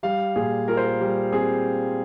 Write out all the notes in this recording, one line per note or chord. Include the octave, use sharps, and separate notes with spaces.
G3 F5
A#2 G#4
F4 A#4
C5
A#4
G3
C4 G#4